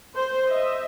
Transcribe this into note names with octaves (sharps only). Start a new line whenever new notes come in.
C5
D#5 E5